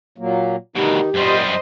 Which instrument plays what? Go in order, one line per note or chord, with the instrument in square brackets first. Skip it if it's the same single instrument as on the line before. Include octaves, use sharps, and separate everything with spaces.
[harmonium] A#2 F#3 A#3
[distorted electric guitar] D2 B2 [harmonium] D#3 D#4 [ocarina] G4
[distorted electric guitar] F#2 G3 [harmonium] A#2 [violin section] C5 D#5